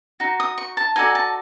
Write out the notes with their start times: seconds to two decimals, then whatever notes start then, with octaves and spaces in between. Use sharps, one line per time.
0.20 D#4 F#4
0.40 D#6
0.58 C#6
0.77 A5
0.96 D#4 F#4 A4 D5 G#5
1.15 A5